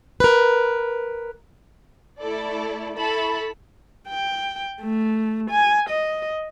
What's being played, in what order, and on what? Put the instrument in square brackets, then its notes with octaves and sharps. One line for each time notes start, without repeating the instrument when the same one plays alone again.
[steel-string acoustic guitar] A#4 B4
[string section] A3 E4 A4 D5
E4 A4 A5 B5 C#6
[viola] G5
A3
G#5
D#5